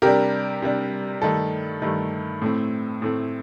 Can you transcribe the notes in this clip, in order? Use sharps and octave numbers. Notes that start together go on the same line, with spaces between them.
C3 G3 D4 G4 A#4
C3 G3 D4
G2 D#3 A3 A4
G2 D#3 A3
A2 A3 C4
A2 A3 C4